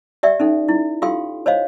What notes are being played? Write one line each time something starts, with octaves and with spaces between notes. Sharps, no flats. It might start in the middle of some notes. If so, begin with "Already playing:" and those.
G4 D5 E5 G5
C#4 D#4 A4
E4
F4 G4 A4 F5 G5 C6
C5 C#5 D#5 F5